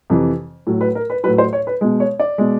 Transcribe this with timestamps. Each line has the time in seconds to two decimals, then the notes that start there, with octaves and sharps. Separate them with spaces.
0.10 F2 C3 E3
0.67 A2 F#3
0.81 B4
0.95 A#4
1.10 B4
1.24 F#3 B4
1.27 A2
1.38 C5
1.53 C#5
1.67 B4
1.81 B2 G#3
2.00 C#5
2.20 D5
2.38 B2 G#3